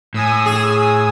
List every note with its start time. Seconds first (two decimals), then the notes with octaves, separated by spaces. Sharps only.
0.14 A2 G#5 D#6 E6
0.46 G#4